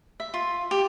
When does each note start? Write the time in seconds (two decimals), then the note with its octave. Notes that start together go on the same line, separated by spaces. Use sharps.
0.20 E5
0.34 F4
0.71 G4